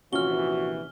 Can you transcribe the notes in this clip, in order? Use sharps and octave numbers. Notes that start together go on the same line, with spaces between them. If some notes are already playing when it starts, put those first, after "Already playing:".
A#1 C3 E3 C#4 F4 F#4 F6 G7